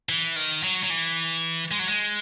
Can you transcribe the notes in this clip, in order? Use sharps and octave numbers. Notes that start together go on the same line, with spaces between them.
E3
D#3
F#3
F#3
E3
G#3
F#3
G#3